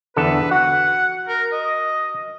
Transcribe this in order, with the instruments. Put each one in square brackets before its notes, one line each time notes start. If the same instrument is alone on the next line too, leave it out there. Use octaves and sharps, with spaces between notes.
[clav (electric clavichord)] E2 D3 A4 [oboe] B4
[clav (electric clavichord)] F#4 [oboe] F#5
[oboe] A#4
D#5